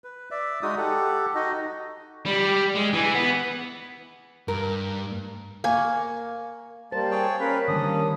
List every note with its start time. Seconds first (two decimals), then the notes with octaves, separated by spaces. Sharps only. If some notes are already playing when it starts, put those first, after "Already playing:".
0.04 B4
0.31 D5 E5
0.62 G#3 D#4 F#4 D#6
0.78 G4 A4 F#5
1.35 D#4 F#4 D#5
2.26 G3
2.76 G#3
2.94 E3
3.15 B3
4.48 G2 A#4
5.64 A#3 G#5 C#6
6.92 G3 A#3 C5 A5
7.11 G#4 C#5 G5
7.27 A#3
7.40 C#4 A#4 B4 F5 B5
7.68 D3 D#3 G3 A#3 C#4 D4 D#6